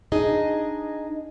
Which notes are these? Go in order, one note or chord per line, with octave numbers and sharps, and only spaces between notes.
D4 D#4 G#4 D#5